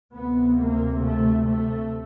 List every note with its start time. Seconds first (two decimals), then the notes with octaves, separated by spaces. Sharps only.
0.12 D2 C3 B3
0.57 A#3
1.02 A3
1.47 A3